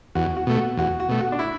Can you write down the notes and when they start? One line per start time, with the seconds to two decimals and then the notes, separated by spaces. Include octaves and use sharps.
0.15 E2 F#4
0.37 F#4
0.47 B2 A3
0.57 F#4
0.77 E2 F#4
1.00 F#4
1.09 B2 A3
1.21 F#4
1.32 D4
1.39 E4